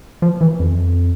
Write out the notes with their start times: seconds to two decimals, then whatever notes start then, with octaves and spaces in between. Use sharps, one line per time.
0.22 F3
0.41 E3
0.60 F2